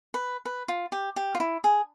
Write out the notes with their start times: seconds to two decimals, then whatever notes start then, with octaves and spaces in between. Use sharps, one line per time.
0.14 B4
0.45 B4
0.68 F4
0.92 G4
1.16 G4
1.35 F4
1.40 E4
1.64 G#4